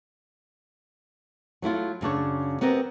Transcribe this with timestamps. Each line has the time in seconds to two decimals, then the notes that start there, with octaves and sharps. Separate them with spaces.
1.62 F#3 A3 E4 F4
2.01 F#2 C#3 D4 C#5
2.61 B3 C4 G4 A#4 D#5